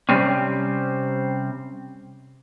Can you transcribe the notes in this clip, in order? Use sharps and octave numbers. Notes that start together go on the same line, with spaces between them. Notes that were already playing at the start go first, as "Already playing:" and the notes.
C3 G3 C4 C#4